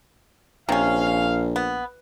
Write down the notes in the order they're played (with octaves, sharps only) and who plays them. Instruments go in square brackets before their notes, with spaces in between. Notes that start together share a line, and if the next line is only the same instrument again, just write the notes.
[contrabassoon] A#1 [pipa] C3 C#4 [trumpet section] F5
[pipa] B3